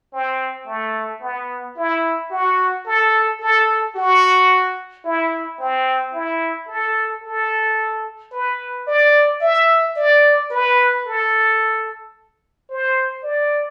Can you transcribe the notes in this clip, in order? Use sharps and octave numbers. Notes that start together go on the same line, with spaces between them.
C4
A3
B3
E4
F#4
A4
A4
F#4
E4
C4
E4
A4
A4
B4
D5
E5
D5
B4
A4
C5
D5